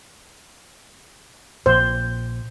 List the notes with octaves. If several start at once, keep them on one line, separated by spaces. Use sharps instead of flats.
A#1 A#2 C5